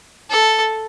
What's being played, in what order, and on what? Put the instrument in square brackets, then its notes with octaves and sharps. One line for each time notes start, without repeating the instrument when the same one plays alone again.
[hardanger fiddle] A4